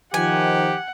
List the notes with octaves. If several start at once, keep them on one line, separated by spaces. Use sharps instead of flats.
D#3 F3 G4 F#5 G#5